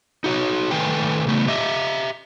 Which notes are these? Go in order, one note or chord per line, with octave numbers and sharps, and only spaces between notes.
D#4 F#4 C#5
D#3 A3 B4 G5 G#5
C#3 A3 B3
G4 D#5 E5